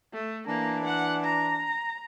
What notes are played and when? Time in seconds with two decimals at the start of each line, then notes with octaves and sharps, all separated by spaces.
0.13 A3
0.47 E3 A#3 D4
0.84 F#5
1.24 A#5